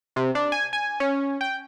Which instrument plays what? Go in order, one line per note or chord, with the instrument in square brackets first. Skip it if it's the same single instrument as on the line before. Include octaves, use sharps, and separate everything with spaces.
[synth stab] C3
D4
G#5
G#5
C#4
G5